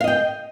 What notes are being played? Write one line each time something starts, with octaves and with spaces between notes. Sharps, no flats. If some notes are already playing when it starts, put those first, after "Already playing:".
D#5 F5 G5